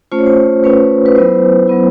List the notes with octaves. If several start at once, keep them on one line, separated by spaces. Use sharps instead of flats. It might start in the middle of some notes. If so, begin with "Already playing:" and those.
A3 C#4 F4 C5
C#5
C5
A3 C#4 F4 B4
B4
F#3 B3 E4 C5
F#3 B3 E4